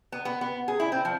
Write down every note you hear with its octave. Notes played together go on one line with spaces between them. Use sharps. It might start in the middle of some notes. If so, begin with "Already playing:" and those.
B3
B3
B3
G#4
E4
C4
F3